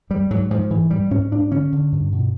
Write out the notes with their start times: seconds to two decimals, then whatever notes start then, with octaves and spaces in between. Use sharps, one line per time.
0.10 F#2 G3
0.31 G#2 F#3
0.50 G#2 F3
0.70 G#2 E3
0.90 G#2 G3
1.11 G#2 C#4
1.32 G#2 D4
1.51 D3 C#4
1.72 D3
1.92 G2
2.12 B2